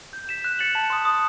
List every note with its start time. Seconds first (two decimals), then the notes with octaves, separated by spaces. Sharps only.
0.13 G6
0.29 B6 E7
0.44 F#6
0.59 A6 C#7 F#7
0.75 A5
0.90 C6 D#6
1.05 D#6